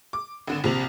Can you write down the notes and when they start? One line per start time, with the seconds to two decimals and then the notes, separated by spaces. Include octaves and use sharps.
0.13 D6
0.47 G#1 D3 E7
0.64 A#1 C3 F7 F#7